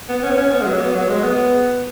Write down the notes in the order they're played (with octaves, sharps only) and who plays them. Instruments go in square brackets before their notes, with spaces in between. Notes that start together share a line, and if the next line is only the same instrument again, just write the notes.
[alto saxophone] B3
C#4
B3
C#4
B3
G#3
F#3
B3
F#3
G#3
B3